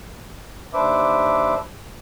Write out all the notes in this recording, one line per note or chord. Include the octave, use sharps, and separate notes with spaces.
D#2 D4 B4 C5 E5 D6